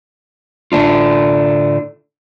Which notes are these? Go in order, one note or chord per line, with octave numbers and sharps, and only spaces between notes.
A2 D3 A3 D4 F4